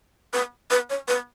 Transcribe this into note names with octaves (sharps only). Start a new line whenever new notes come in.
B4
B4
C#5
B4